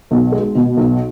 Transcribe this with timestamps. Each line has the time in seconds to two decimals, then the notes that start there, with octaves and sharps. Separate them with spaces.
0.11 B1
0.32 G#3
0.55 B2
0.77 B1